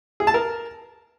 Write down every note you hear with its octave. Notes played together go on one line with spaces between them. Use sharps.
G#4
A5
A#4